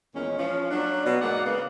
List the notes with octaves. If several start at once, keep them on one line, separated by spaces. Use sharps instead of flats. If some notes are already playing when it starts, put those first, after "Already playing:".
E2 A#2 D#3 G#3 C#4
F3 C#4
F#3 A#3 C#4 D4
B2 F#3
G#2 F#3 G#3 A#3 D5 F#5
C#3 A#3 B3